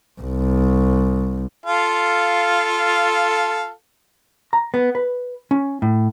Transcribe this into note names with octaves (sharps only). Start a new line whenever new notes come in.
C2
F4 A4 F5
A#5
B3
B4
C#4
A2